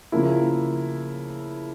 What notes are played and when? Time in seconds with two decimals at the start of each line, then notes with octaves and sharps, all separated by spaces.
0.12 C#3 F3 A#3 E4